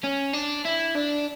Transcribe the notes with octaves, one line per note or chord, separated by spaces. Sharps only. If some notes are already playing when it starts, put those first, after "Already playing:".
C#4
D4
E4
D4